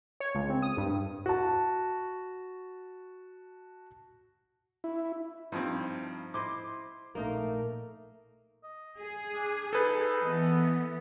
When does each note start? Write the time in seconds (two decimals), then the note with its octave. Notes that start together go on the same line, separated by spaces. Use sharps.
0.20 C#5
0.35 C#2
0.50 C4
0.62 D#6
0.77 G2
1.26 F#4 A5
4.84 E4
5.52 G2 F3 C4 D#4 E4
6.34 E4 C5 D#5 C6 D6
7.15 A#1 A3 A#3 D#4 A#4
8.63 D#5
8.99 G#4
9.34 D4
9.73 D#4 A4 B4
10.24 E3 B3 D#5